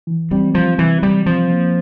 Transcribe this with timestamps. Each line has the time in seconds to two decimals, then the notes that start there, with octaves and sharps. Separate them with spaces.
0.07 E3
0.31 G3 C4
0.55 F3 G3
0.79 C3 E3
1.03 E3 G3
1.26 F3 C4
1.51 A#3